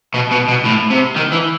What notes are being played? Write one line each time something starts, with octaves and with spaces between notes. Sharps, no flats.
B2
B2
B2
A2
C3
D#3
E3